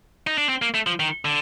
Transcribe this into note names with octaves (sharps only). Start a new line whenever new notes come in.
D#4
D4
C4
A#3
A3
F3
D#3
D3